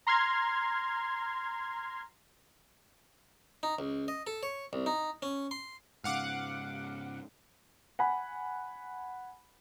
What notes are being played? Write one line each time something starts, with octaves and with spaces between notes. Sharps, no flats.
A#5 C6 F6 G#6
D#4
C#2
D#5
A4
C#5
C2
D#4
C#4
C6
G#2 C#3 F5 F#5 D6
F#5 G#5 B5